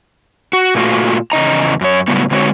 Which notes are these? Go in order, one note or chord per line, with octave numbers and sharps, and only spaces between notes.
F#4
A#2 A3 F4 F#4
E2 C#3 D#5 A#5
F#2 C#5
A2 C#3 F#3 G3 B3
D3 G#3 C4 F#4 C#5